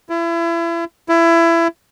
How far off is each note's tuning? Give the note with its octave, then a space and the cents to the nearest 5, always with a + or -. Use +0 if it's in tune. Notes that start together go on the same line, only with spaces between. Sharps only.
E4 +35
E4 +25